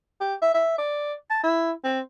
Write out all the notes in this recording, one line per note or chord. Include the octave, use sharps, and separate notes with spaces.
G4
E5
E5
D5
A5
E4
C4